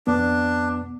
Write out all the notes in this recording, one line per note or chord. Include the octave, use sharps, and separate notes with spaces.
F2 B3 D4